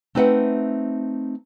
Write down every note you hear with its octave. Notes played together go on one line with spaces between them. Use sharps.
A3 C4 D#4 B4 E5 F#5